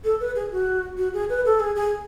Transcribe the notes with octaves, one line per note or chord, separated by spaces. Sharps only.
A4
B4
G#4
F#4
F#4
G#4
B4
A4
G#4
G#4